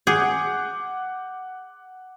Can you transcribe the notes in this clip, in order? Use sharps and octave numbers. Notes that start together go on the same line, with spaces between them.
G#4 F#5 D6 G6